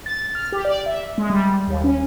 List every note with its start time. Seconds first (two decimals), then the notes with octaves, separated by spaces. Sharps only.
0.06 A6
0.35 F6
0.52 G4
0.65 D5
0.86 E5
1.18 G#3
1.30 G3
1.67 D#2
1.84 C#4